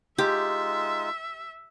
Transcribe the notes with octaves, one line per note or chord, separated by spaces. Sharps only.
G#3 D#4 F4 G4 E5